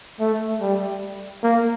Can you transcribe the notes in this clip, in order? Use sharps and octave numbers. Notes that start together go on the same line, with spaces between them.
A3
G3
A#3